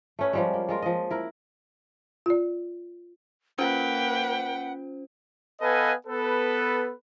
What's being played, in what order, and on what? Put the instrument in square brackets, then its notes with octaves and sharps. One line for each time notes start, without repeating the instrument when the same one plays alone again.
[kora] A3 C#4 B4
F3 G3 G#3
A#3
G#3 F4 A#4
F3 D#5
E4 A#4
[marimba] F4 D5
[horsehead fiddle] A#3 B4 [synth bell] C#4 F4 C5 [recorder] F#5 [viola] G5
[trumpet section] B3 A4 B4 D#5 F5 G#5
B3 A4 B4